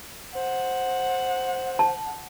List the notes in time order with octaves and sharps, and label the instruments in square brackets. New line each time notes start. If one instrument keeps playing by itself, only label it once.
[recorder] C5 [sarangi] F#5
[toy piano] A5